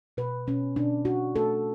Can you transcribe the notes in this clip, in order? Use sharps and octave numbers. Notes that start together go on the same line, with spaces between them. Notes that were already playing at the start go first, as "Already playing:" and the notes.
B2 B4
B2 C#4
B2 D4
B2 F#4
A3 A4